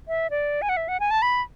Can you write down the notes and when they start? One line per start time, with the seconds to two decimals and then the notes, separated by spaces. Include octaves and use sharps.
0.08 E5
0.30 D5
0.62 G#5
0.69 F#5
0.77 E5
0.88 F#5
1.00 G#5
1.11 A5
1.22 B5